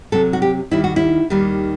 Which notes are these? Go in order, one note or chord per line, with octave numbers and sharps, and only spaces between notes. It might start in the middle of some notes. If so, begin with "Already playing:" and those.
C3 F#3 C4 A4
F#4
G4
D#2 D#3 G3 E4
F#4
E4
D#2 D#3 G3